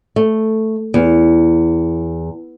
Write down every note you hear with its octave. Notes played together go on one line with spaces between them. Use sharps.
A3
E2